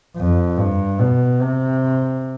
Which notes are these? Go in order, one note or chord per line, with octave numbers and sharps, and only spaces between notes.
F2
G2
B2
C3